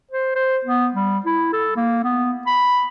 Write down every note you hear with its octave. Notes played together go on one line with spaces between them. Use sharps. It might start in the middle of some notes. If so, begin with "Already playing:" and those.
C5
C5
B3
G3
E4
A4
A#3
B3
B5